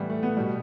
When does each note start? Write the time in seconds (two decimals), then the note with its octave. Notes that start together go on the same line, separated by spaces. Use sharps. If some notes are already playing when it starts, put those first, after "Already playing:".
Already playing: A2 E3 G3 B3
0.10 A3
0.23 B3
0.37 B2 G3